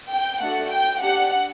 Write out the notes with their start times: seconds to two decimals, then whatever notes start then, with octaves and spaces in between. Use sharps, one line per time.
0.11 G5
0.41 A3 D4 F#4 A4 F#5
0.72 G5
1.02 D4 G4 F#5